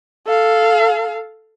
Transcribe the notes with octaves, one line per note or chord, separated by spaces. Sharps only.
A4 F5